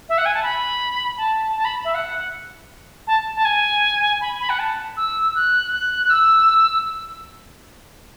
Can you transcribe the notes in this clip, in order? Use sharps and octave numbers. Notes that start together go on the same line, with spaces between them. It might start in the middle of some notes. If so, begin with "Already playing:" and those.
E5
F#5
G#5
A5
B5
A5
A5
B5
E5
F#5
A5
A5
G#5
B5
B5
F#5
A5
E6
F#6
F#6
E6